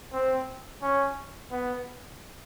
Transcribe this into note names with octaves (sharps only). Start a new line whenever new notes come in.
C4
C#4
B3